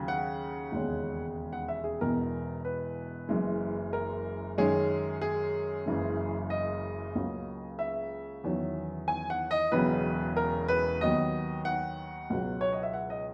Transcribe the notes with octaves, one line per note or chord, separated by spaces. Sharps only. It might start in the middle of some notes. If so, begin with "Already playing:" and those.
Already playing: D#2 C#3 F#3
F#5
E1 D#2 C#3 G#3 C#4
F#5
E5
G#4
E1 E2 B2 A#4
B4
F#1 F#2 E3 G#3
A#4
F#2 D#3 G#3 C#4 G#4
G#4
F#1 F#2 C#3 E3 G#3
D#5
C#2 C#3 F#3 A#3
E5
E2 D#3 F#3 C#4
G#5
F#5
D#5
E1 E2 C#3 F#3 B4
A#4
B4
D#2 D#3 F#3 B3 D#5
F#5
C#2 B2 F#3
C#5
D#5
E5
F#5
D#5